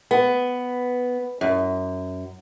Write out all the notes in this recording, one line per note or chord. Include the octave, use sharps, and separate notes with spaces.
B3
F#2